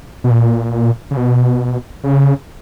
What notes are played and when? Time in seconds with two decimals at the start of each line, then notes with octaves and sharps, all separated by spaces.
0.24 B2
0.31 A#2
1.11 C#3
1.17 B2
2.04 C#3